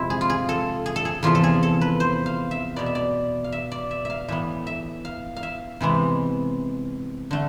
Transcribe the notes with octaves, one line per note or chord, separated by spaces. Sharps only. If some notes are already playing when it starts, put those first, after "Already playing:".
Already playing: F2 C3 G#3 C4 E4
G#4
F4
G#4
A4
G#4
A4
G#4
E2 C3 F3 F4
A4
G#4
A4
B4
C5
F5
E5
B2 B3 D5
E5
D5
F5
E5
D5
E5
E5 F5
A2 E3 B3 E5
E5
F5
F5
E5
C3 E3 G#3 B3
D3 A3